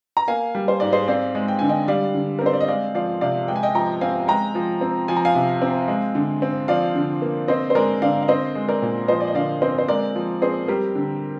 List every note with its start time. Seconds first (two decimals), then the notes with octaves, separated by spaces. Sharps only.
0.17 A#5
0.28 A#3 F5 G#5
0.55 G3
0.68 C5
0.80 G#2 D5
0.92 G#4 C5
1.08 C4 D5 F5
1.35 G#3
1.48 G5
1.59 D3 G#5
1.69 D#5 G5
1.88 G3 D5 F5
2.15 D3
2.39 A#4
2.42 C4 C5
2.53 D5
2.61 D#5
2.68 G#3 D5 F5
2.95 F3 D5 F5
3.21 C3 D5 F5
3.48 G#3 G5
3.56 G#5
3.63 D#5 G5
3.75 F3 G5 A#5
4.01 C4 F5 G#5
4.28 G#3 G5 A#5
4.55 F3
4.81 C4
5.08 F3 G#5
5.17 A#5
5.25 F5 G#5
5.35 C3
5.62 C4
5.88 G#3
6.15 D3
6.42 C4
6.68 F3 D5 F5
6.95 D3
7.22 A#3
7.48 C4 C5 D#5
7.70 C5
7.75 G#3 A#4 D5
8.02 D3 D5 F5
8.23 F5
8.28 C4 C5 D#5
8.55 G#3
8.68 A#4 D5
8.82 A#2
9.08 F3 C5 D#5
9.20 D5
9.28 D#5
9.35 D3 D5 F5
9.62 C4 C5 D#5
9.78 C5
9.88 G#3 A#4 D5
10.15 F3
10.42 C4 G#4 C5
10.68 G3 G4 A#4
10.95 D3